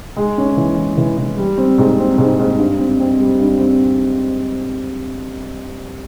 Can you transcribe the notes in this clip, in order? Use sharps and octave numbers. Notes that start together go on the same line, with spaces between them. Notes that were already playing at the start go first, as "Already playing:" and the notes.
G#3
C#4
E3
E3
E3
E3
G3
C4
G#2
C4
G#2
G#2
G2
C4
C4
G3
G2
C4